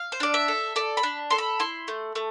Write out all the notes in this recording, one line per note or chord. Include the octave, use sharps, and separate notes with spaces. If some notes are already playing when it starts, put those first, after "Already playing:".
Already playing: F5
C5
D4 D5
E5
A4
A4 D5
B5
D4
A4 C6
B5
E4 C6
A3
A3